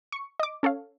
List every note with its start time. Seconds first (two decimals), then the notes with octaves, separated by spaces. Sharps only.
0.12 C#6 C#7
0.40 D#5 D6
0.63 C#4 A4 C#5 F5